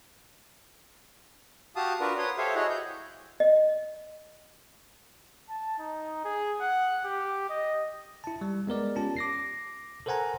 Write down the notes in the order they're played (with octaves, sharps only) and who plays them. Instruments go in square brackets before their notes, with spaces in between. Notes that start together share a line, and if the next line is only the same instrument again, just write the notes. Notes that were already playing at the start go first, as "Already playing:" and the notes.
[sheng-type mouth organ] F#4 G4 F5 A5 D#6
D4 F4 F#4 A#4 B4 D5
B4 C#5 C6 D#6
G4 A4 C5 C#5 E5 F5
E4 F#4 G#4 C#5 D#5 F#5
G6
[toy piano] D#5
[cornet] A5
D#4
G#4
F#5
G4
D#5
[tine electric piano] E4 A5
G3
G#3 B3 A#4 D5
C#4 F4 G4 A5
D6 A#6 C7
A4 A#4 C5 F#5 G#5 A#5